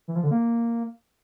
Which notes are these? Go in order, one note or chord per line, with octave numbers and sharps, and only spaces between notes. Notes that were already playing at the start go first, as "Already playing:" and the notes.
E3
F3
D3
A#3